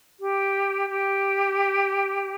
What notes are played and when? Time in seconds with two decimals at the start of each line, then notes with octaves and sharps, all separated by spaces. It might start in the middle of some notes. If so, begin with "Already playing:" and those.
0.20 G4
0.90 G4